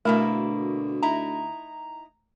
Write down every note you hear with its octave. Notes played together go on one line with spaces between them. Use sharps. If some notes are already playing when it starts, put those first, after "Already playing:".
D2 B2 A3 A#3 E4 A#4
D#4 E4 A#5